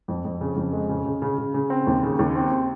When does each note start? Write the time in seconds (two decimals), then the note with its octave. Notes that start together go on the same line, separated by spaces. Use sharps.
0.08 F2
0.25 F2
0.41 C#3
0.56 F2
0.73 G#3
0.89 C#3
1.05 C#3
1.22 C#3
1.38 C#3
1.54 C#3
1.70 C4
1.87 D#2
2.03 C#3
2.19 D#2
2.35 C4